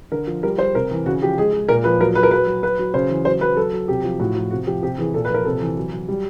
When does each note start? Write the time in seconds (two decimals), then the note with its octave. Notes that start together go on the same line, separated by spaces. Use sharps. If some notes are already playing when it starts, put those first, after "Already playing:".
0.12 D3 A#4
0.27 F3
0.43 G3 A#4
0.59 G3 C5
0.75 C3 A#4
0.91 E3
1.06 C#3 F#4
1.22 F3 G4
1.37 G#3 G#4
1.53 G#3
1.68 A#2 A#4
1.84 F3 B4
2.01 F#3 A#4
2.15 F#3 B4
2.23 A#4
2.31 F#3 B4
2.47 F#3
2.63 F#3 B4
2.79 F#3
2.94 C#3 C5
3.10 E3
3.25 F#3 C5
3.41 F#3 B4
3.57 F#3 A4
3.73 F#3
3.88 C3 G4
4.04 F3
4.20 A2 F#4
4.36 F3
4.51 C3 F#4
4.67 F3 G4
4.82 C3 G4
4.98 E3 G#4
5.14 A#2 A4
5.25 B4
5.30 F3 A#4
5.45 C3 A4
5.61 E3
5.77 F#3
5.92 F#3
6.08 G3